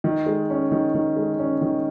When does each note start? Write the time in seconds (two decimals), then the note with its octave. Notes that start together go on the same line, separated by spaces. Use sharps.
0.04 D#3
0.26 G#3
0.50 C#4
0.72 D#3
0.95 D#3
1.17 G#3
1.39 C#4
1.62 D#3